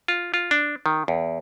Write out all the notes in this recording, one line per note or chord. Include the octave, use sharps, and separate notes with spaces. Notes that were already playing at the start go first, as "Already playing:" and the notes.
F4
F4
D4
D#3
E2